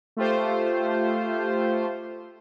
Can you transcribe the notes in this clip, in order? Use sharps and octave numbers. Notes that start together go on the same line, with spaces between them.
A3 F4 G4 C5